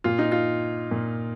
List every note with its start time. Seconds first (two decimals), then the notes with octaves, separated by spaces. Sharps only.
0.04 A#2 F4
0.19 D#4
0.32 F4
0.91 A#2